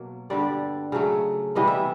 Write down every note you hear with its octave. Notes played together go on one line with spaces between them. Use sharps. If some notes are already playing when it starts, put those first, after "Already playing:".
Already playing: B2 F#3 A#3
G2 D3 G3 D5
C#3 F#3 A3
C3 E3 G3 B3 D#5
E5